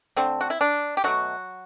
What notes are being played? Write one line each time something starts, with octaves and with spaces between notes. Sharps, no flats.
D3 A3 C4
F#4
E4
D4
G4
B2 F#3 A3 F#4